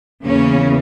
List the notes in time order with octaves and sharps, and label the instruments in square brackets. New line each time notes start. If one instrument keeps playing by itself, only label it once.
[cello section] E2 C#3 E3 A#3 C#4